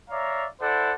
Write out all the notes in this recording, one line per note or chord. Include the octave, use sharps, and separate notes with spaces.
C#5 D5 E5 F5 A#5
E4 A4 C5 D5 F#5